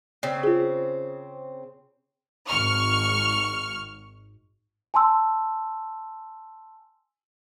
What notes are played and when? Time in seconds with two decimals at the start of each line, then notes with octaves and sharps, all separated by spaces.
0.23 C#3 C4
0.44 F4 G#4
2.47 G#1 C#6 F6
4.94 G#5 A5 C6 E6